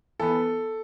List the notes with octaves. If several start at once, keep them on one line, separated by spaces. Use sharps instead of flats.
E3 B3 A4